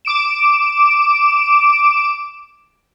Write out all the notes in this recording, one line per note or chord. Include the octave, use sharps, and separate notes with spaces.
D6 D7 E7